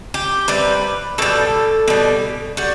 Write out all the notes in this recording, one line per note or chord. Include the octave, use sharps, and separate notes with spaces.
G4
C3 G3 B4
B2 G3 A4
B2 G3
G3 F#4